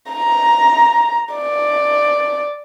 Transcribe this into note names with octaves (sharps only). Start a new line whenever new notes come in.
A#5
D5